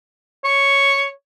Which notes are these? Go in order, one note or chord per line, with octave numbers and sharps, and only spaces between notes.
C#5